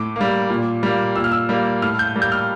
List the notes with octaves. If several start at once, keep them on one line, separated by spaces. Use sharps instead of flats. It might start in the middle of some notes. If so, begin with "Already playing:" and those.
Already playing: A2 D6
G3 A#3
A#2
G3 A#3
A#2 E6
F6
E6
G3 A#3
A2 F6
G6
G3 A#3
G6
F6